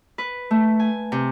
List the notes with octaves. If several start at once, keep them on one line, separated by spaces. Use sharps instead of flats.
B4
A3
G#5
C3